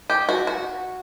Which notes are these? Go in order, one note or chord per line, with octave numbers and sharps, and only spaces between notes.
G4
F#4
F#4